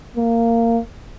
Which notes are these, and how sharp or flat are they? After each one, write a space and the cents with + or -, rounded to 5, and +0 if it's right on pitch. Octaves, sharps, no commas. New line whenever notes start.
A#3 -15